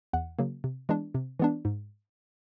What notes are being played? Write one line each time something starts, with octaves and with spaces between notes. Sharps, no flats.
E2 F#5
C#3 F#3 A#3
C3
E3 G#3 B3 D4
C3
E3 G#3 B3 D4
G#2